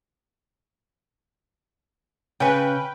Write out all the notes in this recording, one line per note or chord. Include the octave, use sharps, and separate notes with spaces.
C#3 B4 C#5 G5 G#5